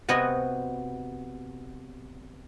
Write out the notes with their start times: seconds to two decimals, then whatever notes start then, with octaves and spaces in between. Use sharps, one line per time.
0.08 C3 B3 F#4 D#5 G#5